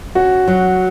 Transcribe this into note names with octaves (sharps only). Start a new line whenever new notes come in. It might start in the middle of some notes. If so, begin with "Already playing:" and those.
C#4 F#4
F#3